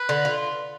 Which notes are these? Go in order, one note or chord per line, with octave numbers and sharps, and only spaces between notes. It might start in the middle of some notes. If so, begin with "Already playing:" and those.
Already playing: B4
D3
F4